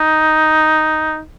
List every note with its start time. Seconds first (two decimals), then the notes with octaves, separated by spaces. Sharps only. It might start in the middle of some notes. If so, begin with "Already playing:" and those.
Already playing: D#4